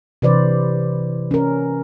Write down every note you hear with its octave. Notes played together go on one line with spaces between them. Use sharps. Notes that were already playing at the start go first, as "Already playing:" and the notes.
C3 E3 B4 C5 D5
C#4 A#4